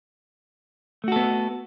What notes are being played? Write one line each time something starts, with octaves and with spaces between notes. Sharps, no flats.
A3 B3 F#4 A4